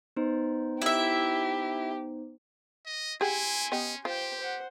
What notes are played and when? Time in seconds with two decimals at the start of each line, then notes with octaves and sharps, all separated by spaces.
0.16 B3 D#4 C5
0.82 E4 G4 E5
2.86 D#5
3.21 E4 G4 G#4 F#5 G#5 C6
3.72 B3 C#4 G4 D#5
4.05 F4 G4 C5 G5
4.40 C5 F#5